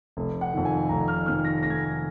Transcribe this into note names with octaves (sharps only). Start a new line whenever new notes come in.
F1
F#5
F2 D#3
G#5
F1 A#5
F6
F2 D#3 F6
A#6
F1 A#6
G#6
A#6